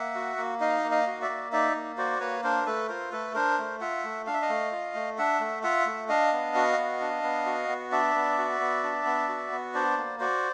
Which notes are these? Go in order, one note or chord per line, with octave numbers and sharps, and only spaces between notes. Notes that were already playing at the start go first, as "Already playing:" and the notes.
Already playing: A#3 E5 F#5
F#4
A#3
D#4 D#5 F5
A#3
D#5 F5
F#4
D5 E5
A#3
D#4 D5 E5
A#3
F#4 C5 D5
A#3 B4 C#5
D4 A#4 C5
A3 A4 B4
F4 A#4 C5
A3 A4 B4
D4 A#4 C5
A3
F4 E5 F#5
A3
D4 F5
E5
D#5 F5
A3
F4
A3
D4 E5 F#5
A3
F4 E5 F#5
A3
D4 D#5 F5
B3
F#4
B3
D4
B3
F#4
B3
D4 D5 E5
B3
F#4
B3
D4
B3
F#4
B3
D4 C5 D5
A#3
F#4 C5 D5